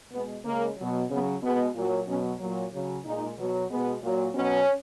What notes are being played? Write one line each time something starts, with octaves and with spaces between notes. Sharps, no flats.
B2 G#3 B3
C#3 G#3 A#3
B2 F#3
C#3 F#3 B3
B2 G#3 B3
A#2 F#3
B2 F#3 C#4
A#2 F#3
C#3 F#3
A#2 G#3 D#4
B2 F#3
B2 G#3 B3
A#2 F#3
B2 F#3 C#4